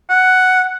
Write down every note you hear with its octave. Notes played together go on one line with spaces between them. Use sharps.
F#5